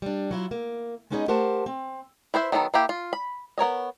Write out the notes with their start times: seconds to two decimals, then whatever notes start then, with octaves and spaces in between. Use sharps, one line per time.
0.02 G3 D4
0.31 F#3 E4 F4
0.51 A#3
1.10 G#3 B3 C#4 D#4 G#4 D#5
1.28 A3 G4 A#4 C5 F#5 A5
1.66 C4
2.34 E4 B4 C5 E5
2.52 D#3 F#3 B3 A4 B4
2.74 A#3 E4 G4
2.89 F4
3.13 B5
3.58 B3 A#4 C#5 D#5